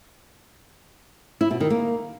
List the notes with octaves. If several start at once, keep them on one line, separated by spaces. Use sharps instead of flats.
E4
B2
D#3
A#3